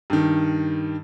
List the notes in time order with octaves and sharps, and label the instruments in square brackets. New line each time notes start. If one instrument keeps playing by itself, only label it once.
[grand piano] G2 D#3